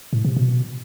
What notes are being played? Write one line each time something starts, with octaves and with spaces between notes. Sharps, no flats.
A2
C3
B2